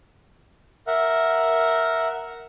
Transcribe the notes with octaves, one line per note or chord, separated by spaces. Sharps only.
A#4 E5 F#5